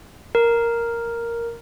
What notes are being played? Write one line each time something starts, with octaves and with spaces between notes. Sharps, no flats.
A#4